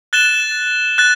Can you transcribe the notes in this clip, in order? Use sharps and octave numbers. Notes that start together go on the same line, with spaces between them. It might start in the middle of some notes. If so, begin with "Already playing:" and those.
F#6 A6 E7 G7
F#6 A6